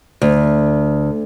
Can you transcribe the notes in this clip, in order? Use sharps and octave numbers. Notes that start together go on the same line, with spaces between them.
D2